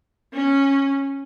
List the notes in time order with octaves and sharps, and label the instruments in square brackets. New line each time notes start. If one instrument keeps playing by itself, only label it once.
[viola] C#4